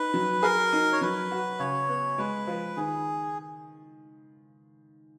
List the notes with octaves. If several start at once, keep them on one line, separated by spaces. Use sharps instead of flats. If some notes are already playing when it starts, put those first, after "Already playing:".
Already playing: D#4 B4
F#3
G#4 A#4
D#4
C#5
F#3 B4
F#4
C#3 C#5
B3
G#3 B4
F3
D#3 G#4